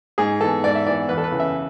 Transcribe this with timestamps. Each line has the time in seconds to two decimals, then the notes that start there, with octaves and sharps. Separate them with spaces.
0.18 G#2 G#4
0.41 E3 B3 A4
0.64 G#2 D5
0.75 E5
0.86 E3 D5
0.91 B3
1.09 E2 B4
1.18 A4
1.24 B4
1.31 C#3 E3
1.40 E5